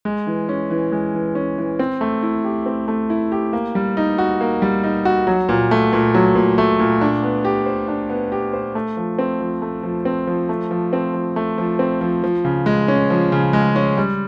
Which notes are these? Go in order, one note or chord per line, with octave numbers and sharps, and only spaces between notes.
G#3
E3
C#4
E3
G#3
E3
C#4
E3
C4
A3
E4
G4
C4
A3
E4
G4
A#3
G3
D#4
F#4
A#3
G3
D#4
F#4
F#3
A#2
A3
A#2
F#3
A#2
A3
A#2
D4
B3
G4
C5
D4
B3
G4
C5
A3
F3
C4
F3
A3
F3
C4
F3
A3
F3
C4
F3
A3
F3
C4
F3
F3
C#3
G#3
C#4
F3
C#3
G#3
C#4
G3